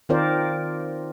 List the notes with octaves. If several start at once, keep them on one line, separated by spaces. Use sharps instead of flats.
D#3 C4 F4 A#4 C5 D5